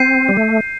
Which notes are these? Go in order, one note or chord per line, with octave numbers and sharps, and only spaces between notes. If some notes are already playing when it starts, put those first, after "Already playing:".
Already playing: C4 G6 C7 D#7
G3
A3